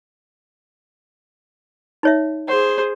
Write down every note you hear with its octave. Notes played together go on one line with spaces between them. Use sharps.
D#4 C#5 E5
G#4 C5 F#5